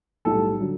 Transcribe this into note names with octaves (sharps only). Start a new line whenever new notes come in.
B1 A2 G3 A4
D3 F#3